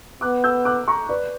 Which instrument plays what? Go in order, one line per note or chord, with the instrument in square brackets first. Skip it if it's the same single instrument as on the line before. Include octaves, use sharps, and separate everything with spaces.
[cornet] B3 [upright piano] D6 F#6
[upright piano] E6 G6
D6 F#6
A#5 C#6
B4 D5